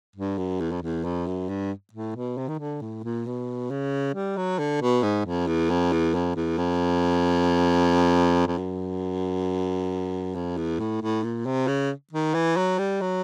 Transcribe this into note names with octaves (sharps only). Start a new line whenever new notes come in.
G2
F#2
E2
F2
E2
F2
F#2
G2
A2
B2
C3
D#3
D3
A2
A#2
B2
C#3
G3
F#3
D3
B2
G#2
F2
E2
F2
E2
F2
E2
F2
F2
F#2
F2
E2
A2
A2
A#2
C3
C#3
D#3
E3
F#3
G3
F#3